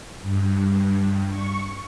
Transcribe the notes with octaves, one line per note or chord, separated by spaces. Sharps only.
G2
C#6